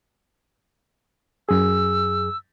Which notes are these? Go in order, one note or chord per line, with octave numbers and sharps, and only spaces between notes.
F#2 G#4 E6